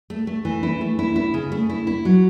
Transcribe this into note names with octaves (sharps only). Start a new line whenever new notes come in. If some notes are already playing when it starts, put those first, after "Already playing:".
A3
A3
E3
E4
A3
E4
E4
C#3
A3
E4
E4
F#3